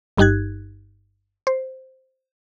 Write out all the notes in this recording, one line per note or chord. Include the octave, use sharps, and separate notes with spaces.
G1 G2 D#4 G4 F#6 G#6
C5